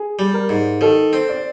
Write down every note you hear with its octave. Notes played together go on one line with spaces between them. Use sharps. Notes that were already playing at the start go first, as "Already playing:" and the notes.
Already playing: G#4
G3
A#4
G#2
D#3 A4
C4
D5